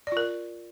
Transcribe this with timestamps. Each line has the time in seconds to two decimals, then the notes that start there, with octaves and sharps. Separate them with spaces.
0.07 D5
0.12 F4
0.17 A#4